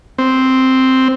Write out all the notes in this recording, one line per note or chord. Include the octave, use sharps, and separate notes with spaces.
C4